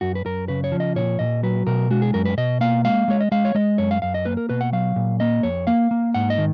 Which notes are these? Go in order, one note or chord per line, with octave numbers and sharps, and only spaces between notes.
F#2 F#4
B4
F#2 A#4
C#3 B4
C#5
F3
D#5
A#2 C#5
A#2 D#5
F#3 B4
B2 A#4
G#3 F#4
G#4
F#2 A#4
B4
B2 D#5
A#3 F5
G#3 F5
G#3 C#5
D#5
G#3 F5
C#5
G#3 D#5
F#2 C#5
F5
F#2 F5
D#5
A#3 B4
A#4
B2 B4
F#5
F#3 F5
A#2
A#3 D#5
F2 C#5
A#3 F5
A#3
G#2 F#5
D#5
D#3